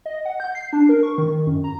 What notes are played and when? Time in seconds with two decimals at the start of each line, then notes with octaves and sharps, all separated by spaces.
0.06 D#5
0.25 F#5
0.40 G6
0.55 C7
0.73 D4
0.89 A#4
1.03 C#6
1.18 D#3
1.47 F#2
1.64 A#5